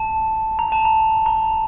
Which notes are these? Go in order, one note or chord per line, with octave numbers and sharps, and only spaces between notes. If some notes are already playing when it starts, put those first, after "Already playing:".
Already playing: A5
A#5
A5
A#5
A#5